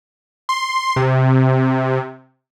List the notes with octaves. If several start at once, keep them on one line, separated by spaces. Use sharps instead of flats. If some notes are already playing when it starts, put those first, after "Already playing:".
C6
C3